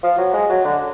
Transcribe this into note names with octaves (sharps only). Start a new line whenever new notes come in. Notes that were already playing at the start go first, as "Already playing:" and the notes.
F3
F#3
G#3
F#3
D3